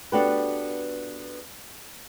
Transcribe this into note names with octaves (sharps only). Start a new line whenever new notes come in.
B3 D4 F#4 G4 A4 B4